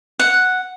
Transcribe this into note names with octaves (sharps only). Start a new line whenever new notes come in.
F#5